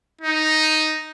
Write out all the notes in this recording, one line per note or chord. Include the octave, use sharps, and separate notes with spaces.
D#4